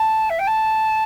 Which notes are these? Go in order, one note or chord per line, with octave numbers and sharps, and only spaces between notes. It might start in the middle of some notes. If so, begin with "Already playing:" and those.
Already playing: A5
E5
G5
A5